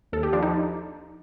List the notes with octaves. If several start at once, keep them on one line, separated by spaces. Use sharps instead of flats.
D#2 A4
G4
F3 D4
D#4